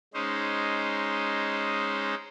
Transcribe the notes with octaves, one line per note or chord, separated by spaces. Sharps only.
G#3 C#4 D#4 C5